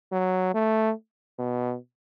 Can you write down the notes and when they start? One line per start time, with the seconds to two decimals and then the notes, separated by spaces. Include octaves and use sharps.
0.12 F#3
0.54 A3
1.38 B2